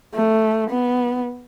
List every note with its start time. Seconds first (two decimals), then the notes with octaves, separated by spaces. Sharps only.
0.14 A3
0.70 B3